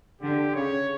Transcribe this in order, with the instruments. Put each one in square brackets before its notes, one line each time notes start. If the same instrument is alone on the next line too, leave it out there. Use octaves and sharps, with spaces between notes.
[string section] D3 [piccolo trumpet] G4
[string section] C#3 [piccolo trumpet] C#5